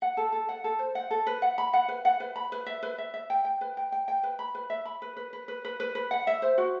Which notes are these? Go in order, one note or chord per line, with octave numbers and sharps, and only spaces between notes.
F#5
A4
A4
F#5
A4
C5
F#5
A4
B4
F#5
B5
F#5
B4
F#5
B4
B5
B4
E5
B4
E5
E5
G5
G5
B4
G5
G5
G5
B4
B5
B4
E5
B5
B4
B4
B4
B4
B4
B4
B4
F#5
E5
C5
F#4